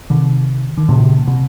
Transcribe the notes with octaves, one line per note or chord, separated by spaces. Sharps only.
C3 D#3
D#3
A#2 C#3
C3